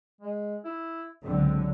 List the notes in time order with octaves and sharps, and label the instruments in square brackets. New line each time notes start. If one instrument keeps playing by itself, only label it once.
[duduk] G#3
E4
[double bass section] C#2 D3 F#3 [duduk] C4